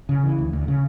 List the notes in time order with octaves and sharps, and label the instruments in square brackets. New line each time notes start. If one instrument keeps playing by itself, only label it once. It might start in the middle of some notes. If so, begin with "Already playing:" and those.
[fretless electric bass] C#3
E3
D2
D2
C#3